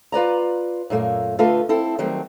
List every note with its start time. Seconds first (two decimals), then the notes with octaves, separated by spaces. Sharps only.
0.12 F4 B4 D5 A#5
0.90 F#2 A#2 A3 A#3
1.39 D3 A3 F4 A4 B4
1.69 C4 E4 A4
1.99 D#3 F#3 G3 A3 C4